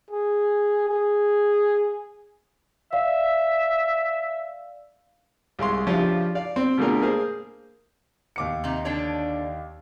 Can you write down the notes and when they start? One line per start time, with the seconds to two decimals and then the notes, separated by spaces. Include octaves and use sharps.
0.11 G#4
0.89 G#4
2.93 D5 E5 F5
5.59 C2 G#3 F5 C6
5.87 C#3 F3 D4 E4 F4 G4
6.35 D5 F5
6.56 C4
6.78 B2 D3 A3 F4 G#4 A#4
7.02 A#3 G#4 A#4 C5
8.36 D#2 D6 C#7
8.64 C3 D#4
8.85 D3 D4 C#5